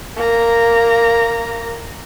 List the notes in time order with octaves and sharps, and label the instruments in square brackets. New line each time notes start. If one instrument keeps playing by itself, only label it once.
[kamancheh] A#3 A#5